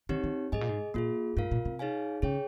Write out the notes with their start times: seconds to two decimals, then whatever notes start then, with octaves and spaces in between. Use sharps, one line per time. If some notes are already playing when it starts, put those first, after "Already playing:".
0.09 D#3 C4 D#4 G4 C#5
0.24 D#3
0.52 G#2 G#4 D#5 G#5
0.61 A#2
0.69 G#2
0.94 A#2 A#3 F4 G#4
1.37 G#2 F4 A#4 F5
1.51 A#2
1.65 C3
1.79 D#4 G#4 C#5 F5 G#5
2.22 C#3 G#4 C#5 G5